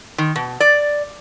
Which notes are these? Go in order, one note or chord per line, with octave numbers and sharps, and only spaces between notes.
D#3
B2
D5